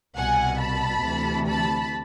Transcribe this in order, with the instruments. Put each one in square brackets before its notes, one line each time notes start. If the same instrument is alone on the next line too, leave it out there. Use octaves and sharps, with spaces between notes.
[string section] C2 B2 F#5 G#5
A5 B5
D2 C3 E3
A5 B5